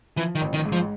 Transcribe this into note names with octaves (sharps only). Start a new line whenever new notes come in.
E3 F3
D#3
A1
D#3
G#2
F3